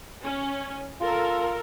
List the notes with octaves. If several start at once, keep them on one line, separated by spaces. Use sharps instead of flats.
C#4
F4 A4 A#4